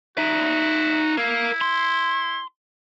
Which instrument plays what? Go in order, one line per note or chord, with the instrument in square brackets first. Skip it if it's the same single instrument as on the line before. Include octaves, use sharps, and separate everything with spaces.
[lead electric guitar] D#4 E5 [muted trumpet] F#4
[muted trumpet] E4 [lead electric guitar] A#4 F5
[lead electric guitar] C6